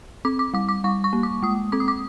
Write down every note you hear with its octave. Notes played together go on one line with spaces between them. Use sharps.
C4 D6
D6
G3 D6
D6
G3 C#6
C#6
A#3
D6
G#3 D#6
C4 D6
D#6
D6